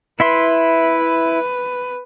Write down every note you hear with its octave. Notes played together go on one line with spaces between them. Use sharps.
E4 B4 E5 C6